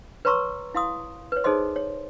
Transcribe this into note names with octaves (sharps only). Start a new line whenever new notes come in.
B4 C#5 A#5 C6 C#6 E6
E4 F5 C6 D#6
B4 C#5
D#4 G#4 A4 C5 D#5 C6
C#5